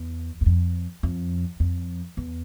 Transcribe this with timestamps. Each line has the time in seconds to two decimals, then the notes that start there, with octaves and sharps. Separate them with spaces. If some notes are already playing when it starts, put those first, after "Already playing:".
Already playing: E2
0.41 E2
0.46 F2
1.03 F2
1.60 F2
2.17 E2